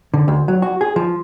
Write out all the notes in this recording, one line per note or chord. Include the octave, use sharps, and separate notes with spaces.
D3
D2
F#3
F#4
G#4
F3